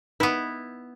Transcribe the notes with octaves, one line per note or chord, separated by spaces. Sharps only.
B3 D#4 E4 B4